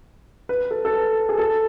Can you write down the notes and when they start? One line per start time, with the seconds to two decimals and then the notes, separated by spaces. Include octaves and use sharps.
0.49 B4
0.71 A4
0.85 A4
0.94 B4
1.29 G#4
1.39 A4